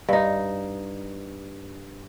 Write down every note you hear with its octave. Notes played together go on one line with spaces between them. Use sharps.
G2 D#4